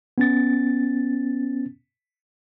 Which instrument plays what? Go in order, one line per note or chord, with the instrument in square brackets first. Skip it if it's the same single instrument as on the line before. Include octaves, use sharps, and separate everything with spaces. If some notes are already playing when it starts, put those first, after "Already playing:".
[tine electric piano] B3 C#4 A6